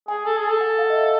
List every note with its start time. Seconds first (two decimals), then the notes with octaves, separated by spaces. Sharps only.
0.08 G#4 G#5
0.25 A4 A5
0.38 G#4
0.43 G#5
0.50 A4
0.61 F#5
0.78 F5
0.90 D#5
0.96 E5